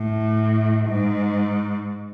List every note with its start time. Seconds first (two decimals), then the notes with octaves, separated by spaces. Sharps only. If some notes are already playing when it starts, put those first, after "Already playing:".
Already playing: A2
0.88 G#2